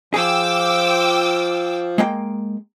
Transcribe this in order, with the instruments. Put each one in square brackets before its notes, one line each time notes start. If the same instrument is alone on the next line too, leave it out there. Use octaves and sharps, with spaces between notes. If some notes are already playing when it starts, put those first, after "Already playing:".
[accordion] F3 [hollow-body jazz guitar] G#4 [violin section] G5 D6 E6
[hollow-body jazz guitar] G#3 A#3 G5